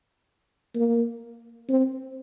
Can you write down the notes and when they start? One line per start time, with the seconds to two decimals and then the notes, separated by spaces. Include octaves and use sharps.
0.75 A#3
1.69 C4